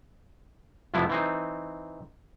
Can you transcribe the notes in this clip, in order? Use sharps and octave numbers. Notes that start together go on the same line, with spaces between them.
F2 C3 F3 B3 E4
E3 C4 D#4